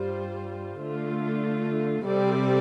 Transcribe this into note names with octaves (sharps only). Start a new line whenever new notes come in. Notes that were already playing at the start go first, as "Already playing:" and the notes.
Already playing: G2 G3 F4 C5
D3 A3 F4
C3 G3 C4 A4 D5